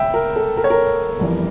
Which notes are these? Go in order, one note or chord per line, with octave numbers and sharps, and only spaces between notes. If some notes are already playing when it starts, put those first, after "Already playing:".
Already playing: C#3 E5 G5
A#4
A4
A#4
C#5
A#4
G1 F2 E3 G3